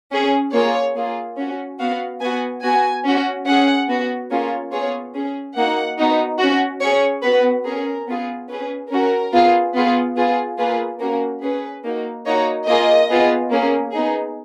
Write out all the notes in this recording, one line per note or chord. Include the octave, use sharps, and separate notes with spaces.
C#4 G#4
A#3 F4 G#4 C#5
A#3 F4 G#4
C#4 F#4
B3 F#4 F5
B3 F#4 G#5
B3 F#4 G#5
C#4 F#4
C#4 G#4 F#5
B3 F#4
A#3 C#4 F4 G#4 C#5
B3 F4 G#4 C#5
C#4 G#4
A#3 D#4 F#4 F#5
B3 D#4 F#4
C#4 F#4
C#4 G#4 C#5
B3 F#4 B4
C#4 G#4 A#4
B3 F4 G#4
C#4 G#4 B4
C#4 F#4 A#4
B3 F4 G#4
B3 F4 G#4
B3 F4 G#4
A#3 F4 G#4 B4
A#3 C#4 F#4 A#4
C#4 G#4 B4
A#3 D#4 F#4
A#3 D#4 F#4 C#5
A#3 F4 G#4 D#5
B3 F4 G#4
A#3 C#4 G#4
B3 D#4 G#4